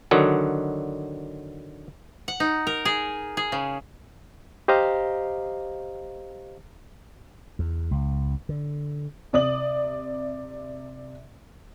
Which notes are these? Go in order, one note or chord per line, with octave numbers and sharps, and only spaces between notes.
D3 D#3 F#3
F#5
D#4
A#4
G#4
G#4
C#3
G4 C5 D#5 F5 A#5
E2
C#2
D3
C3 D5 D#6 F#7